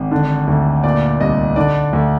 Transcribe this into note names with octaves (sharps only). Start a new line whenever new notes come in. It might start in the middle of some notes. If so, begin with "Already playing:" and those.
Already playing: G#1
D3
D2
A#2 D5
C2 D#5
D3 D5
D2